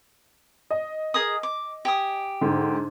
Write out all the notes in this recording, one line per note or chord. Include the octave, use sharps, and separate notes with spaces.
D#5
G#4 A#4 D#6
D6
G4 G#5 D#6
G#2 D3